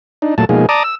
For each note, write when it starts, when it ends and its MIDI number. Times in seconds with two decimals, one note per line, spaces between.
0.22 0.35 62
0.22 0.35 63
0.38 0.45 46
0.38 0.45 54
0.38 0.45 57
0.38 0.45 81
0.49 0.66 47
0.49 0.66 53
0.49 0.66 56
0.49 0.66 58
0.49 0.66 63
0.49 0.66 68
0.69 0.83 74
0.69 0.83 81
0.69 0.83 82
0.69 0.83 86
0.69 0.83 87
0.84 0.95 88